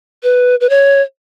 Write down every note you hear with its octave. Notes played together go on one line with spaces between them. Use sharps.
B4
B4
C#5